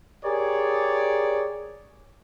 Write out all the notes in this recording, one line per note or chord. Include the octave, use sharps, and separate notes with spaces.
G4 G#4 A#4 C#5 D5